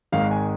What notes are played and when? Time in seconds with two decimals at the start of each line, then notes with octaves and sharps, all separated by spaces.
0.12 G#1 G#2 D#3 G#3 F5
0.31 G#5